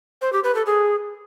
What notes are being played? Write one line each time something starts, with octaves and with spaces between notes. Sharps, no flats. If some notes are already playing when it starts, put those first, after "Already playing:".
C5
G4
B4
A4
G#4